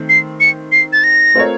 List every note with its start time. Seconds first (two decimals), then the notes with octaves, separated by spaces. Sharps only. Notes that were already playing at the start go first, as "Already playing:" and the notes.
Already playing: D#3 A3 C4
0.09 C7
0.40 C#7
0.72 C7
0.93 A6
1.04 A#6
1.35 A3 C4 F4 A#4 C#5